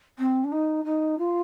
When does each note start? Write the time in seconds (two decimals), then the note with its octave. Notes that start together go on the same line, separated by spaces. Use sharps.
0.18 C4
0.44 D4
0.52 D#4
0.85 D#4
1.18 F4